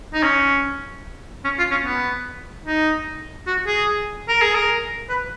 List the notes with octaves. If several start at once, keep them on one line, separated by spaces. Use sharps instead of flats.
D#4
C#4
C#4
F4
C#4
B3
D#4
F#4
G#4
A#4
G#4
A#4
B4